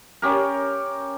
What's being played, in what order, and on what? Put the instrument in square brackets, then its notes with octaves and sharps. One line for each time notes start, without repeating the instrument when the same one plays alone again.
[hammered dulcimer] C#4 G4 A#4